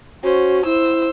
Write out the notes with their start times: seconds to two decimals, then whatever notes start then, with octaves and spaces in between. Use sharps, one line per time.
0.23 C#4 F#4 C5
0.65 E4 C5 E6